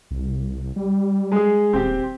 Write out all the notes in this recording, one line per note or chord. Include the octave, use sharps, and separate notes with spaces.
C2
G3
G#3 G#4
D#1 C4 G4